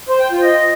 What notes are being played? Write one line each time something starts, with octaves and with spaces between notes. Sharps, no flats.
C5
G5
F4
D#5